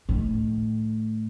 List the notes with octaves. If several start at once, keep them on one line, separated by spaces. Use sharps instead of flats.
A2 D#3